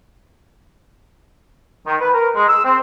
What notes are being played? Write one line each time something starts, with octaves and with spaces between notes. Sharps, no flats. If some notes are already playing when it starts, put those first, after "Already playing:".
D#3
B4
A#4
G#3
E6
C4